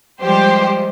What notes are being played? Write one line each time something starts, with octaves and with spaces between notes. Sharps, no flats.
F3 G3 G#3 G4 C5